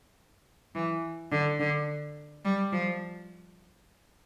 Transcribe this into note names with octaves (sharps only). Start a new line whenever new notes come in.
E3
D3
D3
G3
F3